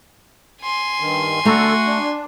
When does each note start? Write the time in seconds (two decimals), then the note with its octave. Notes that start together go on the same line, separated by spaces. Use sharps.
0.62 G#5 C6
1.00 G2 D#3
1.45 D3 A3 F#4 A4 A#5
1.86 D4